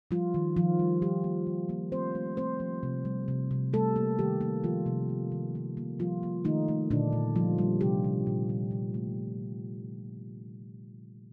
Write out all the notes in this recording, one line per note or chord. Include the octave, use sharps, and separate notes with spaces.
F3 G3 F4
D#3
D#3 F3 F4
G3
D#3 G3 G4
A#3
D#3
A#3
A3 C4 C5
A3
A3 C4 C5
F3
C3
G3
C3
C3
G3 A3 A4
A#3
D#3 G3 G4
A#3
D#3 F3 F4
C3
D#3
D#3
A#3
A#3
F3 G3 F4
A#3
D#3 A3 D#4
A3
A#2 D3 D4
A#2
F3 G3 F4
G3
C3 G3 G4
C3
A#2
A#2
A#2
A3